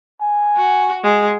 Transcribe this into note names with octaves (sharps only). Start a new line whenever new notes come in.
G#5
F#4
G#3